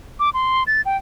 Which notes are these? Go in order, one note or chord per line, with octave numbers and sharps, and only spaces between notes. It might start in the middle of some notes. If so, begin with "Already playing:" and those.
D6
C6
A6
G5